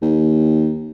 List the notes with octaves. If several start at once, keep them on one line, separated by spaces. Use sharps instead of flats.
D#2